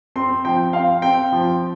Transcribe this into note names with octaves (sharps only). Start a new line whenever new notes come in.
C4 C6
F3 G5
C4 F5
C4 G5
F3